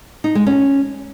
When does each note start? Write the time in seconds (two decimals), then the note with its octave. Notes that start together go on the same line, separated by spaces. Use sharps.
0.24 D#4
0.35 G#3
0.47 C#4